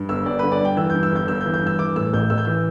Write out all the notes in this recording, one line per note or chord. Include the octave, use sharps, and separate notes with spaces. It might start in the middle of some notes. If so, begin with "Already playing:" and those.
Already playing: G2
G1 E6
G1 D5
D3 B4
D5
G2 G5
E3 E6
G2 G6
E6
G1 G6
G1 E6
G6
E3
G6
G2 E6
E3 D6
A2 E6
A1 G6
A1 E6
G6
E3 E6